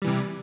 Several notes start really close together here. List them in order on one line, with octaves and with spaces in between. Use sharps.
G3 E3 C3